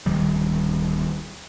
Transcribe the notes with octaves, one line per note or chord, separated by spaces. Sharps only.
D1 D#3 G3